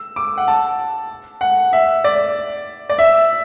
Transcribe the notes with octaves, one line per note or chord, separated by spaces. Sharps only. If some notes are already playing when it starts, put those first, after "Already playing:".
Already playing: E6
D6
F#5
A5
F#5
E5
D5
D5
E5